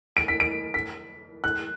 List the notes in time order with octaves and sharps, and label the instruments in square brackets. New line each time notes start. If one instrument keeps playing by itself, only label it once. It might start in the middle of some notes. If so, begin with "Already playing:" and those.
[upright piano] D7
B6
D7
B6
F#6